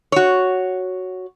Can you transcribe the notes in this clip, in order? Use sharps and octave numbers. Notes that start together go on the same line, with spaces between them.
F#4 C#5